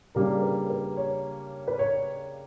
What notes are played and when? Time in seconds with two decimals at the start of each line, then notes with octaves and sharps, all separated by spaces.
0.15 C#3 G3 A#3 D4 A#4
0.42 B4
0.70 B4
0.97 C#5
1.68 B4
1.79 C#5